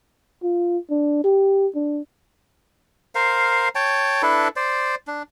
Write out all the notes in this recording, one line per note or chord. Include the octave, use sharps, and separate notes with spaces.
F4
D4
G4
D4
A#4 C5 F5
C#5 G5 A5
D4 E4 A4 B4
C5 D5
D4